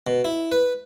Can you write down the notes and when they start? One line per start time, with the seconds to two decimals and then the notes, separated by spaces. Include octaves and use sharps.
0.07 B2
0.25 E4
0.52 B4